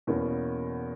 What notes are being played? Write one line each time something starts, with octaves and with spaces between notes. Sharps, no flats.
E2 B2 A#3 C#4